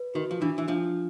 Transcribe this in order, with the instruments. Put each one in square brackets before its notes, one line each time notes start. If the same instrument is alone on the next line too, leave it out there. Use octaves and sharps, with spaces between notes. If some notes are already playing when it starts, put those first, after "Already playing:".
Already playing: [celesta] B4
[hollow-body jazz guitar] D#3 [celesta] F#4
[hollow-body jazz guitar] F3
[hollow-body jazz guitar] E3 [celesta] D4
[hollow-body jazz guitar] E3
[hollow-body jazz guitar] F3 [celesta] D4